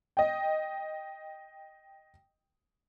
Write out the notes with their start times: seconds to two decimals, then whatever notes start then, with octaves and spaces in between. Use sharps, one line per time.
0.17 D#5 G5